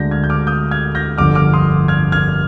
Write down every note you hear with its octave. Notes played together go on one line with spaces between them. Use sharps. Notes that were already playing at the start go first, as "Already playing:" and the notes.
Already playing: D2 D3 G#3 D4 G6 A#6
F6 G#6
G6
D6 F6
D#6 G6
F6 G#6
G6 A#6
G1 F2 D3 D6 F6
D6 F6
C6 D#6
F6 G#6
F6 G#6